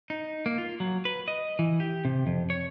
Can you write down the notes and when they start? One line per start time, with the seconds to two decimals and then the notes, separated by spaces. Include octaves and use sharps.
0.10 D#4
0.46 A#3
0.58 F4
0.80 F#3
1.05 B4
1.28 D#5
1.59 E3
1.80 G4
2.05 C3
2.27 F2
2.50 C#5